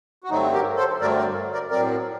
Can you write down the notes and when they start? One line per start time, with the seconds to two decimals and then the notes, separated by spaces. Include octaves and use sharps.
0.24 F#4
0.30 G2 D3 F#3 A3 C4 D#4
0.53 G4 A#4
0.77 A4 C5
1.00 G2 D3 F#3 A3 C4 A#4 D5
1.18 A#4 D5
1.53 A#4 D5
1.71 A2 F#3 C4 A#4 D5